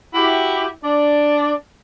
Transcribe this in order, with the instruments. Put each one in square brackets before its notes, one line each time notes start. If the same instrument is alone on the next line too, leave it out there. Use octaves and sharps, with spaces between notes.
[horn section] E4 F#4 G4
D4 D5